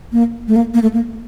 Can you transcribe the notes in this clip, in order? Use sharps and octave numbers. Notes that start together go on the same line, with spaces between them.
A#3
A3
A#3
A#3
A3
A#3